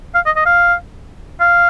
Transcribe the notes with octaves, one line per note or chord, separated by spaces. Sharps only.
F5
D#5
D#5
F5
F5